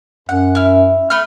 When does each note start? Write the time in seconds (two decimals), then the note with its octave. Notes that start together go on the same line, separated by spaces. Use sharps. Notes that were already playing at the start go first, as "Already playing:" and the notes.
0.29 F#2 F#5
0.55 E4 F6
1.10 A3 B5 F6